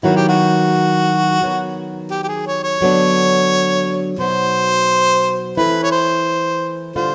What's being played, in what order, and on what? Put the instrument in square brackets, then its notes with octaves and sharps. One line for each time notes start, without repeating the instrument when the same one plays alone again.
[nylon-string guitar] D#3 F#3 B3 E4 [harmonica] F#4
[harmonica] G4
F#4
[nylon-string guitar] D#3 F#3 B3
[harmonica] G4
G4
G#4
C#5
C#5
[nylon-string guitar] D3 F#3 B3 D4
[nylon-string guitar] B2 F#3 B3 D#4 [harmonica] C5
[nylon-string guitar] E3 A3 C4 E4 [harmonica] B4
[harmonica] C#5
C5
[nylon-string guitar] D3 G3 C4 F4 [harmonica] C5